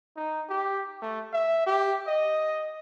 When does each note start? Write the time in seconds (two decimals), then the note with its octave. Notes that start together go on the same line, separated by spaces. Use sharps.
0.16 D#4
0.49 G4
1.02 A3
1.34 E5
1.67 G4
2.07 D#5